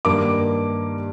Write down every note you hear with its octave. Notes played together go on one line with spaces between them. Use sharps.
G2 D#3 A#3 D6